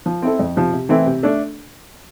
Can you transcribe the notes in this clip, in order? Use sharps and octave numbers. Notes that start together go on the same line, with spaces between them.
F3
C4 E4 A4
F2
C3 F3
C3
E3 A3 C4 E4
C3
A3 D4 A4